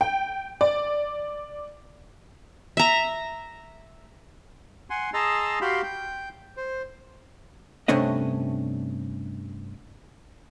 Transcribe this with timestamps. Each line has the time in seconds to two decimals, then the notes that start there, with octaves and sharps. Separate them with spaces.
0.01 G5
0.61 D5
2.77 E5 A#5
4.90 F#5 G#5 C6
5.14 G#4 D#5 A5 A#5 C6 E6
5.61 F#4 G4 F5 G5 B5 C6
5.83 G5
6.57 C5
7.88 G2 C3 A3 C#4 D4 D#5